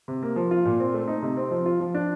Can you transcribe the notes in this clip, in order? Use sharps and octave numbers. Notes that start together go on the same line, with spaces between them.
C3
A#3
F3
F4
A#2
C4
A3
D#4
C3
C4
F3
F4
F3
D4